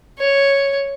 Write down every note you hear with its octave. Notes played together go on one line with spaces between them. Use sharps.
C#5